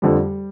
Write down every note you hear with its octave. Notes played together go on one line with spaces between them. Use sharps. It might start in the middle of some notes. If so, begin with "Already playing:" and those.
F2 D3 F3 G3